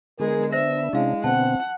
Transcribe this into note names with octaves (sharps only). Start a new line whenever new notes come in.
D3 G#3 B3 G#4 A#4
D4 C5 E5 A#6
C3 G#3 C#4 E4 F5
B2 D3 B3 C4 F#5 A5